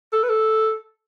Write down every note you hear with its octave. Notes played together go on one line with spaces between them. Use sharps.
A4
B4
A4